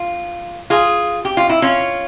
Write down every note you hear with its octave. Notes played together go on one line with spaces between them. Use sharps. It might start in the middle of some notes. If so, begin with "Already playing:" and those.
Already playing: F4
F4 G#4
G4
F4
E4
C#4 F4